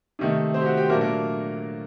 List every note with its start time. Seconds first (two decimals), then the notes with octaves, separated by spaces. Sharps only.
0.19 C3 D#3 A3
0.54 C4 C5
0.61 G4
0.66 F#4
0.77 G4
0.85 C5
0.89 A#2 F#3 A3 A#3 D4 A#4
1.01 A#3 A#4